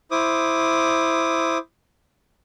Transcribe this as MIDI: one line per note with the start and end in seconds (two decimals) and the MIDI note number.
0.11 1.58 64
0.11 1.58 72
0.11 1.58 86
0.11 1.58 87